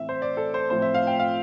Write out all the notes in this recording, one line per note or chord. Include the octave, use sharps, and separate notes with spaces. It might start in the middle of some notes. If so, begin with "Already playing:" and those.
Already playing: A2 E3 A3 C4 E5
C5
D5
A4
C5
A2 F3 C4 C5
E5
F5
G5
F5